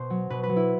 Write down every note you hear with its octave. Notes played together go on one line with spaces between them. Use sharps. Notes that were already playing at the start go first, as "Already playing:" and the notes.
Already playing: B2 C5
F#3
B2 B4
B4
F#3
E4